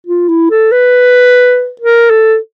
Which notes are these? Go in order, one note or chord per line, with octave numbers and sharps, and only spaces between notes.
F4
E4
A4
B4
A#4
A4